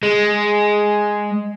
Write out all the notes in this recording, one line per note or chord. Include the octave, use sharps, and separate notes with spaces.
G#3